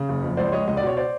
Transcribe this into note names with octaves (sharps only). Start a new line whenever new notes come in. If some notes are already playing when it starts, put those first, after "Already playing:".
Already playing: C#3
F#1
F2
C#2 C5 D5
G#3 C#5 D#5
C#2 D#5
D5
B2 C#5
C5 D5